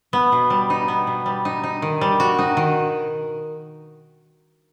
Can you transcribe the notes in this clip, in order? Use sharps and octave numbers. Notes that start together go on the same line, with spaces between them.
B3
B2
G3
D#4
B3
B2
G3
D#4
D#4
D#3
G3
F#4
D#4
D#3